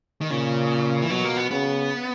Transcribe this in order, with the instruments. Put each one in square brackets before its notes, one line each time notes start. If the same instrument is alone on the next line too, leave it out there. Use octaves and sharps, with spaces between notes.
[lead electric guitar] D#3
[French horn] A#2 [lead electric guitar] C#3
[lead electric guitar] E3
[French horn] B2 [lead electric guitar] F#3
[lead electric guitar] A#3
B3
[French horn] C#3 [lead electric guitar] B3